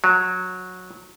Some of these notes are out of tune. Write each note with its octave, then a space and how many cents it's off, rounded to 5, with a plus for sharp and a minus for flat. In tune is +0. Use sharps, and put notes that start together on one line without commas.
F#3 -15